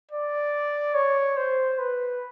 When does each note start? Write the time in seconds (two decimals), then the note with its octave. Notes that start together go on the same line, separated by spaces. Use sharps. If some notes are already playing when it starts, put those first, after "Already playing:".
0.11 D5
0.95 C#5
1.37 C5
1.79 B4